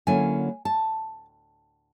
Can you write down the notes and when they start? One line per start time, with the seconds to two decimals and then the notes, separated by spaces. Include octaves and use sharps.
0.07 D3 F#3 A#3 C#4 E4 G#5
0.65 A5